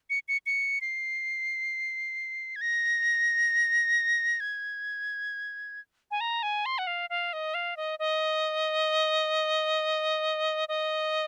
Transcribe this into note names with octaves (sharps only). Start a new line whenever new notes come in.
C#7
C#7
C#7
C7
G#6
A#6
G#6
G#5
A#5
G#5
C6
F#5
F5
F5
D#5
F5
D#5
D#5
D#5